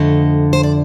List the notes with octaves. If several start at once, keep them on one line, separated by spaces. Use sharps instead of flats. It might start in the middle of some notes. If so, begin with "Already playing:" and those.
Already playing: F2 D3 A3 D#5
C5
D5